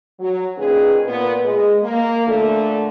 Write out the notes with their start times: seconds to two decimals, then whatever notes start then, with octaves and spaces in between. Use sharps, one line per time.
0.19 F#3
0.57 A#2 D#3 A#3 C#4 G#4 B4
1.07 A#2 B3
1.43 G#3
1.82 A#3
2.27 A#2 D3 A3